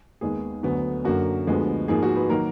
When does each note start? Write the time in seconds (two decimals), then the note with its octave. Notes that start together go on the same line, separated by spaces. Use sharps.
0.21 D#2 D#3 G#3 B3 G#4
0.63 D2 D3 F#3 B3
1.04 F#2 D3 F#3 A#3 F#4
1.47 D2 D3 F3 G#3 B3
1.88 G#2 F3 A#3 G#4
2.03 F#4
2.16 B4
2.30 D#3 F#3 A#3 A#4